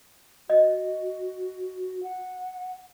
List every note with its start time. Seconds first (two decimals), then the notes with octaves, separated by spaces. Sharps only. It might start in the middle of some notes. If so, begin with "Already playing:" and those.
0.50 F#4 D#5
2.03 F#5